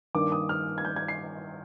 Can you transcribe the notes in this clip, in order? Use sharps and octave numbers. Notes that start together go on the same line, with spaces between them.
G2 D#3 A#3 D4 D6
D#6
F6
G#6
G6
G#6
C7